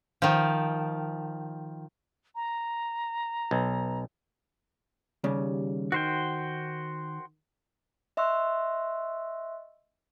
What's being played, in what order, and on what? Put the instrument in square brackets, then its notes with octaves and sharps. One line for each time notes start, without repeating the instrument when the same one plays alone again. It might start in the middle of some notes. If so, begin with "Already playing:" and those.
[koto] D#3 F3
[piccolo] A#5
[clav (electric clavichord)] B1
[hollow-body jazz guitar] D#2 C#3 G3
[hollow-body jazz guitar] D#3 [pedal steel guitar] F#4 C5 G5
[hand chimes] D#5 E5 C6 C#6 E6 F#6